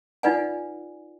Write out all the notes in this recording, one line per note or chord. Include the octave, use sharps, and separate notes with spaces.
D#4 F4 B4 D5 F#5 G#5